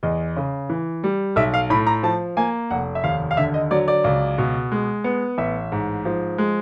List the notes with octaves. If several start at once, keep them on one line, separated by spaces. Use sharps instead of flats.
E2 D#5
C#3
E3
G3
B1 E5
F5
A2 B5
A#5
F3 A5
A#3 G#5
F1 F#5
E5
D#2 F5
F5
D3 E5
D#5
F#3 D5
D5
C#2
B2
G#3
B3
A1 E5
G#2
F3
G#3